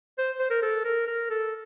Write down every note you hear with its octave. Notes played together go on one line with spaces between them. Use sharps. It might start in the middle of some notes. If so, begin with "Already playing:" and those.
C5
C5
A#4
A4
A#4
A#4
A4